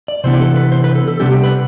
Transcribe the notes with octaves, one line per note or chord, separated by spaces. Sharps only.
D5
C3 E3 B3 D4 C5
G4
A4
B4
C5
B4
A4
A4
C3 G3 B3 D4 G4
G4
B4